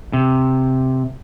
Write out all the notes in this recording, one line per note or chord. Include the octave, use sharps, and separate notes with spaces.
C3